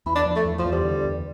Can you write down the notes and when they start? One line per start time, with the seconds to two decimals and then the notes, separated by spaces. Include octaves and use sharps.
0.06 E2 E4
0.15 D4
0.26 F3
0.36 A3
0.45 E2
0.59 F3
0.65 E2
0.72 G3
0.84 D3
1.05 E2